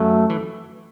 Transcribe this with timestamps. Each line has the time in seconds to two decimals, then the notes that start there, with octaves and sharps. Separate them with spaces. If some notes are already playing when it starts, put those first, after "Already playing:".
Already playing: F#2 F#3 A3
0.30 E3